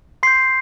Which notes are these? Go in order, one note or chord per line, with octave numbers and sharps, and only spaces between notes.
C6 G6 C7